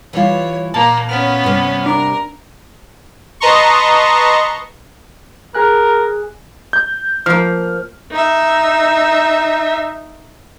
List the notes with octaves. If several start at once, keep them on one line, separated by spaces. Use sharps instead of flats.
E3 G3 F4 C#5
A#2 A#3 A5
B3 C#4 F6
G2 C3
D4 A#4
B4 D#5 A5 A#5 C6 C#6
G#4 A#4 G#5 F#6
G6
F3 A#3 F6
D#4 E5